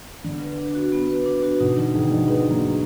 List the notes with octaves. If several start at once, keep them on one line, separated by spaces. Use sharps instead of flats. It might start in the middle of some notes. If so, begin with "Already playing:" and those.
D3 B3
B4
D4
F#4
B3
B4
D4
F#4
B2 D#4
D3 D#4
B2 D#3 G#4
D3 F3 D#5
G#3 B3 D#4
D#4
F#3 A#3
G#4